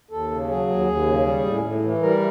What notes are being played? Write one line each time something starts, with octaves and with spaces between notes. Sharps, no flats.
D#2 A4
C#3
F#3 G#4
D#2
D#2
C#3
G3
A2
A2
E3
G3 A#4